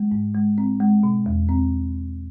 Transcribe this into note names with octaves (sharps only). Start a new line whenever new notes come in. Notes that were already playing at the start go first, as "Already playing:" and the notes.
Already playing: G#3
G#2
G#3
C4
G#3
B2
E2
C4